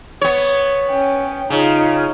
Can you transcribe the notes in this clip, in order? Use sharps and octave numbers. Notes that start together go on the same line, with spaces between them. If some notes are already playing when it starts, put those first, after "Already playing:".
B3 C#5
C#4 G5
C#3 D#4 F4